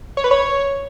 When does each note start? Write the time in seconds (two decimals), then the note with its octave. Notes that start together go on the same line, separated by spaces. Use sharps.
0.17 C#5
0.24 B4
0.31 C#5